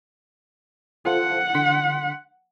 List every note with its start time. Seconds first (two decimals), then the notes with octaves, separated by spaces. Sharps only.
1.06 F4 A4 C5 F#5
1.55 D3 C6 B6